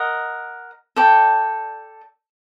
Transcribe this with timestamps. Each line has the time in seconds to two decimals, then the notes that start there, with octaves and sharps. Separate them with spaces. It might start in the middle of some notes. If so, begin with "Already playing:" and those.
Already playing: A#4 D#5 F#5
0.96 A4 D5 G5